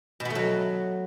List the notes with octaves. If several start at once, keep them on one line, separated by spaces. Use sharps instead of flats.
B2
B3
A3
F#3